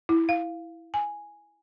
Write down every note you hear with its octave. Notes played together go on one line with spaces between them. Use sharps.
E4
F5
G#5